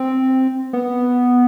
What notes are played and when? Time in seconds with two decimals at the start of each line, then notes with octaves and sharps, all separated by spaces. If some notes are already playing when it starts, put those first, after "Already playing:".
Already playing: C4
0.73 B3